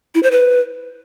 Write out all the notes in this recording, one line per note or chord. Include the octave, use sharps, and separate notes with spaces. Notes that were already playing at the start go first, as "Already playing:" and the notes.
E4
C5
B4